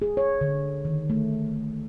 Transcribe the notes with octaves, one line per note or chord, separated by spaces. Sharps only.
G#4
C#5
D3
D#3
A3